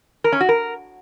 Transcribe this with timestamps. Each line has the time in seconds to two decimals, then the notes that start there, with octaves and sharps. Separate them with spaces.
0.24 A#4
0.32 C#4
0.41 F#4
0.49 A#4